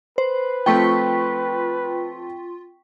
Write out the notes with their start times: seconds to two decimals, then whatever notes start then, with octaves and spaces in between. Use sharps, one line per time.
0.18 B4 C5
0.66 F3 A3 C4 F4 G5 C#6 B6